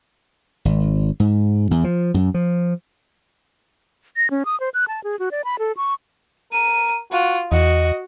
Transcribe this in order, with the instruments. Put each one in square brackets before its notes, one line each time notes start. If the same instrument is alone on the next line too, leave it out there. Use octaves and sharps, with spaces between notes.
[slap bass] G#1
G#2
E2
F3
F#2
F3
[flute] A#6
C#4
D#6
C5
F#6
A5
G#4
F#4
D5
B5
A4
C#6
[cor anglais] A#4 [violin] D#7
[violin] F4 [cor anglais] F#4
[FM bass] E2 [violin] F#4 [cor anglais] D#5